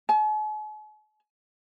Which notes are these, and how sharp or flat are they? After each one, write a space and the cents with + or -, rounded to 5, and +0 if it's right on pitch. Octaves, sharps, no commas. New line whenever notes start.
G#5 +45